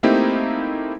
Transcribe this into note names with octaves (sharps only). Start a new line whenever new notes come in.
A3 A#3 C4 D#4 E4 G4